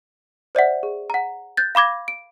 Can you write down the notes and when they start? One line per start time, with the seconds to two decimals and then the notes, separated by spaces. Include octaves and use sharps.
0.55 C5 D5 E5 F#5
0.83 G#4
1.10 F#5 A#5
1.57 F#6 G6 A6
1.75 F5 B5 D6 G#6 A#6
2.08 D7